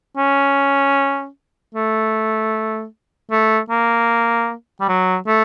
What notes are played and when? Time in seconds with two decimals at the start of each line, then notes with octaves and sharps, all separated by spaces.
0.17 C#4
1.75 A3
3.31 A3
3.70 A#3
4.81 G3
4.89 F#3
5.27 A3